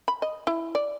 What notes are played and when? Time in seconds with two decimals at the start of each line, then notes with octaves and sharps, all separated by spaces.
0.08 B5
0.22 D#5
0.47 E4
0.75 D5